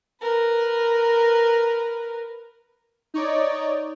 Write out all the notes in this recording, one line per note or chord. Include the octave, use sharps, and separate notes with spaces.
A#4 B4
D#4 C#5 D5